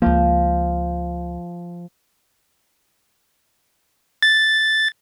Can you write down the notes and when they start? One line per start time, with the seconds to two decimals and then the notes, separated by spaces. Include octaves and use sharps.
0.02 C#2 F3 A#3
4.22 A6